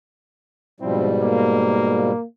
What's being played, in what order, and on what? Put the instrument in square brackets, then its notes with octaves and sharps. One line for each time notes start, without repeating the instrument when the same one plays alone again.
[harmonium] G#2 B2 G3 [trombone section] F3 C4 E4
[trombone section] A#3